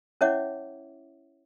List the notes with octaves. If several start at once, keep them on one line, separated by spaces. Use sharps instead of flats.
C#4 E4 C#5 E5 F#5 D6